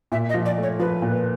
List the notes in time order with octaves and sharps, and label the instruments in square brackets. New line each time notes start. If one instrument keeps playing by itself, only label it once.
[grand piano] A#2 [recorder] E5
[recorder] D#5
[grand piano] F3
[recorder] D5
[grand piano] A3
[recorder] C#5
[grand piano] F3 [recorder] B4
[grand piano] A#2